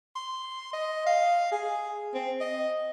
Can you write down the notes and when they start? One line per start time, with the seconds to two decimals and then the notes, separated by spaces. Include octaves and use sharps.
0.16 C6
0.73 D#5
1.07 F5
1.52 G#4
2.15 C4
2.41 D#5